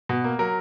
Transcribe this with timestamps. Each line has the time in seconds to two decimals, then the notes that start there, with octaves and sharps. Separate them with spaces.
0.09 B2
0.24 A#3
0.39 F#3 A#4